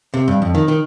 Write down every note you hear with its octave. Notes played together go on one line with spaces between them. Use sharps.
C3
G2
F2
D#3
D#3